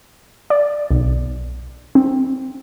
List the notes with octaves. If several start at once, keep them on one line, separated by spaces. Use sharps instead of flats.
D5
B1
C4